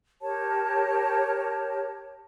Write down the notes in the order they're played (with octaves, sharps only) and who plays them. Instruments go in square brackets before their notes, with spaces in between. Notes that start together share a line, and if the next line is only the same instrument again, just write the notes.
[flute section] G4 A#4 C#5 A5